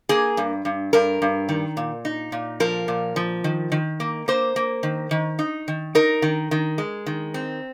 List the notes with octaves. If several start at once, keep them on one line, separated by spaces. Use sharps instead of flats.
A#3 G#4
G2
G2
G2 A#4
G2
D#3
A#2
D#4
A#2
F3 A#4
A#2
F3
D#3
D#3
A#3
A#3 C5
A#3
D#3
D#3
D#4
D#3
D#4 A#4
D#3
D#3
G#3
D#3
C4